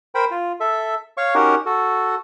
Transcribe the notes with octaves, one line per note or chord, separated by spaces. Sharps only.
A#4 C5 G5 B5
F4
A4 E5
C#5 F5 C#6
C#4 D#4 F#4 G4 A#4 F#5
F#4 A4